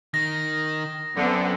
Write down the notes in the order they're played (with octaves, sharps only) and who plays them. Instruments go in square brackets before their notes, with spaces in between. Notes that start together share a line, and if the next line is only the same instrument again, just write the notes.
[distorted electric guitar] D#3 [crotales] A#6
[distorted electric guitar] F#2 [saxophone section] D3 [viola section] B3 C4